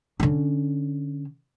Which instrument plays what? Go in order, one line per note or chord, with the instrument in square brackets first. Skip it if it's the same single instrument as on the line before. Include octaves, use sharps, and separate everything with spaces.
[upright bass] D3 C#4